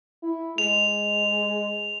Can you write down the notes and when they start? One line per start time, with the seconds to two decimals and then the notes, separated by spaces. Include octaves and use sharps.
0.23 E4
0.58 G#3 F7